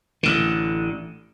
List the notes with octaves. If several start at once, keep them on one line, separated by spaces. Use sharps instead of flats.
A1 D3